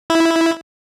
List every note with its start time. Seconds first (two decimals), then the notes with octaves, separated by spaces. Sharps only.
0.10 E4